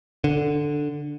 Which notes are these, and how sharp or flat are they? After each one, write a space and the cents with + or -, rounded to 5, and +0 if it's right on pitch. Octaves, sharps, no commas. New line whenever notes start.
D3 +5